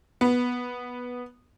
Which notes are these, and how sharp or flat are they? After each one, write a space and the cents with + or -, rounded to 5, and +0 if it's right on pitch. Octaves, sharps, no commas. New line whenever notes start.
B3 -5